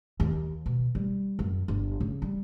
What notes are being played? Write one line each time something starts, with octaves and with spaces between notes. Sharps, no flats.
D#2
B2
G3
F#2
G1
C#3
G3